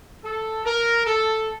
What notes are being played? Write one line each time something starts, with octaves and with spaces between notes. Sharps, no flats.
A4
A#4
A4